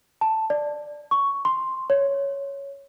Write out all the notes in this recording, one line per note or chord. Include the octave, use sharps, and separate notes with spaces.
A5
D5
C#6
C6
C#5